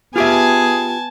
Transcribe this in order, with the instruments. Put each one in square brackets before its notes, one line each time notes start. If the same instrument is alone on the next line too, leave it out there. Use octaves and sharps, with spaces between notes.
[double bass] B3 [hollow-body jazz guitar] F4 G4 E5 [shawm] G#4 [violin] G#5 A5